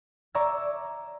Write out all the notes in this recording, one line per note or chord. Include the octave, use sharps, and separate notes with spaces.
D5 E5 A#5 C#6 E6 G#6